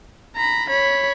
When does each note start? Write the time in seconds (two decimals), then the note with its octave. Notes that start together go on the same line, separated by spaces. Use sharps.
0.36 A#5 B5
0.69 C#5 B5